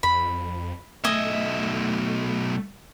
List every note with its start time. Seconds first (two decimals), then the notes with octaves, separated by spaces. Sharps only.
0.03 F2 B5
1.04 B1 A3 D#5 E5 G#5